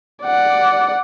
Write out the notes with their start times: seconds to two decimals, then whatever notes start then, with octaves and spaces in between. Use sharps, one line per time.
0.24 D5 F#5